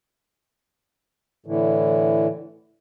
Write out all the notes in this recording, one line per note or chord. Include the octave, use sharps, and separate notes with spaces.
A2 D3 E3